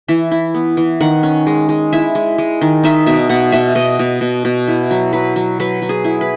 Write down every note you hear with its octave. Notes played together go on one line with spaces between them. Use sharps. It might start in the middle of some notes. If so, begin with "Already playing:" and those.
E3 E5
E4
B3
E3
D#3 F#5
C#4
G#3
G#3
E4 E5
G#3
G#3
D#3
D#4 E5
B2 E5
B2 F#5
B2 E5
B2 D#5
B2
B2
B2
E4
F#3
F#3 B4
F#3
F#3 B4
F#3
G#4
E4
B4